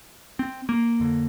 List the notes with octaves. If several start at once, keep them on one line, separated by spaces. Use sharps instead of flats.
C4
A#3
F2 D3